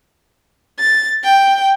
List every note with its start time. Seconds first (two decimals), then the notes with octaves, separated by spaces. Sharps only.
0.79 A6
1.24 G5